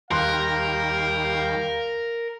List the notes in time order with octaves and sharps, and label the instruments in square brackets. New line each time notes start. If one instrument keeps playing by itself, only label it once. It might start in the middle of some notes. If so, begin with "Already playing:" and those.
[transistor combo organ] D#2 G3 G5 [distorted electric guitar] A#4 [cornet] F5 [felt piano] C6 F#6